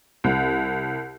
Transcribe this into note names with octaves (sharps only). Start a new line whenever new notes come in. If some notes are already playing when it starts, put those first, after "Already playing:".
C2